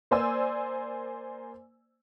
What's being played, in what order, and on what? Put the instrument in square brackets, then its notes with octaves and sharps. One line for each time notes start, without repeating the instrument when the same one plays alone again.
[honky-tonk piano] A#3 C5 D5 G#5 E6